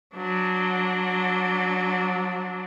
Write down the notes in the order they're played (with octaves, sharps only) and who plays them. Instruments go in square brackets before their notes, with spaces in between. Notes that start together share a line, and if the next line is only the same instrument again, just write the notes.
[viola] F#3 D4